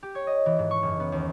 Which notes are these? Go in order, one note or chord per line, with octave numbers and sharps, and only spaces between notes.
G4
C#5
D#5
E3
G#2
C#6
F#1
B3
D#2